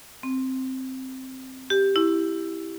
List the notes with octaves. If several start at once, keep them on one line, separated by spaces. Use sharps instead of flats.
C4
G4
E4